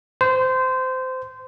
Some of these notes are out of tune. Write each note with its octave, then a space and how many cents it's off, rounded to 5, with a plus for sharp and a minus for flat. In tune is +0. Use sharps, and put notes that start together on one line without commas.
C5 -20